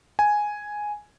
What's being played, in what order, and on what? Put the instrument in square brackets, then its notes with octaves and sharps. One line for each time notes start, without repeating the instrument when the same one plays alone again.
[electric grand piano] G#5